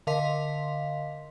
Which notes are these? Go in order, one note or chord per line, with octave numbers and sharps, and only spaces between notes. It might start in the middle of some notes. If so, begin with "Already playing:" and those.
D3 A#4 D#5 F5 C6 B6